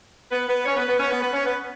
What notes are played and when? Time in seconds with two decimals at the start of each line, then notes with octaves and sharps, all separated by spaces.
0.32 B3 B4
0.49 B3 B4
0.66 C#4 C#5
0.76 B3 B4
0.88 B3 B4
1.00 C#4 C#5
1.11 B3 B4
1.22 B3 B4
1.34 C#4 C#5
1.45 B3 B4